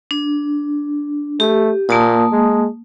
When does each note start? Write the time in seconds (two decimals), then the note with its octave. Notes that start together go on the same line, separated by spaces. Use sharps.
0.11 D4
1.40 A3 G4
1.89 A#2 A#3 A5 D#6
2.32 G#3